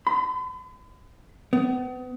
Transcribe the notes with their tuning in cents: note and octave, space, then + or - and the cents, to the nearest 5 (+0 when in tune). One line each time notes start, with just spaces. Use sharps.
B5 +45
B3 +35